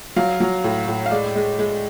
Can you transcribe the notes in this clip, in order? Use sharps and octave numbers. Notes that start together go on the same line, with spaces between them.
F#3 F5
F#3
A2
A2
F5
G#3 D5
G#3
G#3